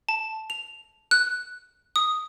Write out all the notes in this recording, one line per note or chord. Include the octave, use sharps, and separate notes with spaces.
A5
F7
F#6
D#6